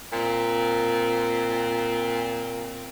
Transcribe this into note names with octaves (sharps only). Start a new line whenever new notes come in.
A#2 C4